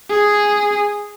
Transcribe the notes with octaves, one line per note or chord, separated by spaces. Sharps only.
G#4